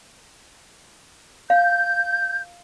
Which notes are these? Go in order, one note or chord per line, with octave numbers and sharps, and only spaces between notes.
F5 G6